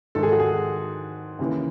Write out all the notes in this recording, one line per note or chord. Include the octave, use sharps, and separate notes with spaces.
G#2 D#3 A4
G#4
F#4
G#4
D#2 C#3 E3